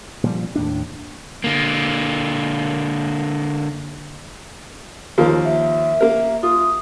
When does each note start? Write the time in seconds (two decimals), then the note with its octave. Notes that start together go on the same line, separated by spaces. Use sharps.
0.23 A#2 F3 G3
0.56 D#2 A2 D4
1.44 D3 A#3
5.18 D#2 F3 A#3
5.45 E5
6.01 A#3 A#4
6.43 F4 D#6